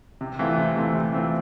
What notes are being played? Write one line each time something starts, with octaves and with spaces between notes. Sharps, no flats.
C3
E3 A3 C4 F4
C3
E3 A3 C4 F4
C3
E3 A3 C4 F4